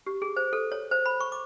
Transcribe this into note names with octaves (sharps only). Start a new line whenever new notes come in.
G4
G#4
C5
A4
C#5
C5
B5
C#6
D6